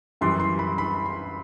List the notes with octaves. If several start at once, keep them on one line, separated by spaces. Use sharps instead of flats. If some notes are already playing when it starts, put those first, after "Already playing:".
F#2 E3 G3 C6
C6
B5
B5
C6